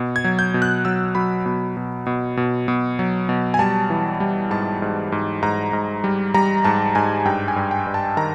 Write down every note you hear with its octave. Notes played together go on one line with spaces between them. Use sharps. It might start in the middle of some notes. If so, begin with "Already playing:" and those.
Already playing: B2
G#6
F#3
G6
B2
F#6
F#3 E6
F#3 B5
B2
B2
B2
B2
B2
F#3
B2
G#5
G3 A5
E3
G3
G#2 A5
G#2
G#2
G#2 A#5
G#2
G3
G3 A#5
G#2 A5
G#2 G#5
G2 G5
G#5
G2
G5
G2
A5
D#3 A#5